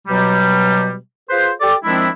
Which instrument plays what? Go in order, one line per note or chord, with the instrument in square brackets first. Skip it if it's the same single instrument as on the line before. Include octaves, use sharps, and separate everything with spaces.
[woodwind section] B2 F#3 G3
F4 G#4 B4 C5
G4 A4 D5
D#3 F3 G#3 C4 D4 E4